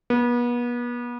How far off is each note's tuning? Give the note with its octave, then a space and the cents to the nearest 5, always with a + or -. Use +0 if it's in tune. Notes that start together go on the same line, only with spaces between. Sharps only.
B3 -35